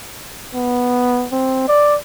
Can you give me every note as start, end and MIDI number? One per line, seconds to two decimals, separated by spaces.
0.55 1.26 59
1.32 1.66 60
1.68 1.97 74